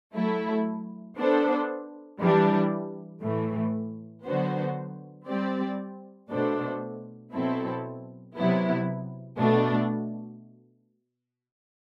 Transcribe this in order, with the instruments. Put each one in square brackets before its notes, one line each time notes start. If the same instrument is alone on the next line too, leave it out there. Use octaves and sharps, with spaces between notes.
[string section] F#3 A3 E4 A4
B3 D4 A4 C5
E3 G3 D4
A2 E3 A3
D3 F#3 B3 F#4 C5
G3 C4 G4 D5
B2 A3 D4 A4 C5
B2 F#3 C4 E4 A4
C3 F#3 B3 E4
B2 A3 D4